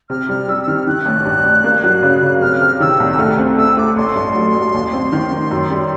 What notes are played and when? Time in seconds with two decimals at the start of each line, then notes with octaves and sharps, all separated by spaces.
0.09 C3 F6
0.29 G3 F6
0.48 G3 E6
0.62 E6
0.67 D#3 F6
0.87 D#3 F#6
1.06 A1
1.25 G2
1.45 G2
1.64 A#3
1.84 F#3
2.03 C#3
2.23 C#3
2.41 C3 F6
2.61 C3
2.80 D#3 E6
3.00 C2
3.19 A3 F6
3.38 C4
3.57 A3 E6
3.77 A3 D6
3.96 A1 C6
4.15 G2
4.35 F#3
4.54 A1
4.74 D#2
4.93 C4
5.12 D#3
5.32 D#3
5.51 F#2
5.71 G3